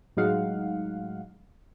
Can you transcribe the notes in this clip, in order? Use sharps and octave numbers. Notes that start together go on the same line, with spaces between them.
A2 F#3 G#3 D#4 F5 F#5